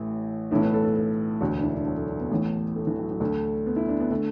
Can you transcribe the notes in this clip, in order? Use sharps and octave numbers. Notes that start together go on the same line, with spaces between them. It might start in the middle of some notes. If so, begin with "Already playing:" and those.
Already playing: A1 A2 E3 E4
B1 A2 E3 E4
B4
A4
A4
A4
E1 D2 D3 F#4
D4
E4
D4
F#3
A3
D4
B3
A1 A2 E3
A3
E3
F#3
F#3
D2 D3 A3
B3
E4
D4
B3
D3 A3